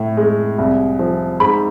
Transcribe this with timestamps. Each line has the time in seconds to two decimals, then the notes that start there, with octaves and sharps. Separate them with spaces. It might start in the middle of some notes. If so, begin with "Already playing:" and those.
Already playing: A2
0.17 G#3
0.58 C2
0.99 F3
1.40 G#2 B5